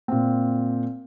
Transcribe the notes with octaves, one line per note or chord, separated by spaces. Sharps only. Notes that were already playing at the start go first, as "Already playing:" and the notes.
A#2 C4